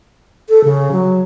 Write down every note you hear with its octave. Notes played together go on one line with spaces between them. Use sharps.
A4
C#3
F#3